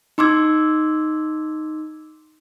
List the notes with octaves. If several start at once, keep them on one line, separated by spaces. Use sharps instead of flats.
D#4 C6 D6 E6 G#6